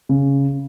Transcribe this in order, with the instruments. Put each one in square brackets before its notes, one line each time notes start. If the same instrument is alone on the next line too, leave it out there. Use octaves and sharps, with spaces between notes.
[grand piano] C#3